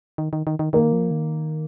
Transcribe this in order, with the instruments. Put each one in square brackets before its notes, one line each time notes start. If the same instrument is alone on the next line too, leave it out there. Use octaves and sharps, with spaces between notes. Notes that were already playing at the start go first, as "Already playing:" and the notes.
[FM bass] D#3
D#3
D#3
D#3
[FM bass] D#3 [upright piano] A#3
[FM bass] F3
D#3